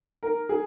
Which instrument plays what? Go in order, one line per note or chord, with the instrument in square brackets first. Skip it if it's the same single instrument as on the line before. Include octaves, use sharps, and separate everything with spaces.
[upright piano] A#4
G#4